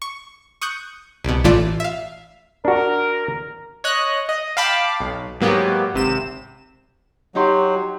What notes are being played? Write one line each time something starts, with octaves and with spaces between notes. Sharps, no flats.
C#6
C#6 D#6 F#6 G6 C#7
C2 B2
A1 E3 A3 F4 D5 E7
E5 F5
D4 F#4 A#4
C#5 D#5 F#6
D#5
F5 G5 A5 B5 D6
B1
G#2 F#3 A#3 B3 G4
G#1 C3 E7
F#3 D#4 G4 C6